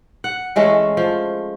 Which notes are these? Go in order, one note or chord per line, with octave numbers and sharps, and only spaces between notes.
F#5
E3 G#3 A3 C#4
F3